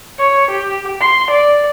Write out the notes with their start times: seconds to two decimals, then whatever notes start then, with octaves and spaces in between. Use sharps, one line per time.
0.19 C#5
0.51 G4
1.01 C6
1.31 D5